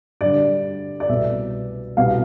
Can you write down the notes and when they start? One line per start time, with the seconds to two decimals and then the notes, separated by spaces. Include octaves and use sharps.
0.21 G2 D3 G3 D5
1.00 D5
1.09 C2 B2 B3 E5
1.97 C2 B2 B3 F5